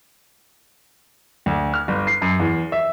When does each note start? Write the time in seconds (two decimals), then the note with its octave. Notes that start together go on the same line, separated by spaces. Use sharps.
1.46 D2
1.74 F6
1.88 G1
2.07 C7
2.22 F#2
2.40 E2
2.72 E5